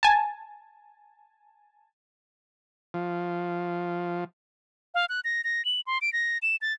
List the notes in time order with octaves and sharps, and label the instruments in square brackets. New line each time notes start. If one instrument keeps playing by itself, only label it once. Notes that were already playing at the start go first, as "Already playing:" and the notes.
[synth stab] G#5 A5
[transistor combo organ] F3
[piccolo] F5
F#6
A#6
A#6
F#7
C6
D7
A#6
E7
A6